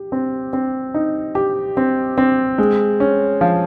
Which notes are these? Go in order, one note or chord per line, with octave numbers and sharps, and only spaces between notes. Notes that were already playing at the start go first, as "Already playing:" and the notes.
Already playing: G4
C4
C4
D#4
G4
C4
C4
G#3
C#4
F3